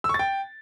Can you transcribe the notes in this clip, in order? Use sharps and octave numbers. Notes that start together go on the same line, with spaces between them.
E6
C#6
A6
G5